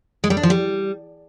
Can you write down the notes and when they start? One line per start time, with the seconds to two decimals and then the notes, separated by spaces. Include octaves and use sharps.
0.24 G#3
0.30 G3
0.37 D4
0.43 F3
0.50 G3